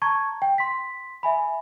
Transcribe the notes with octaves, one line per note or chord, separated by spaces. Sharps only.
A5 A#5 C#6 G#6
G5
C6 B6
E5 G#5 B5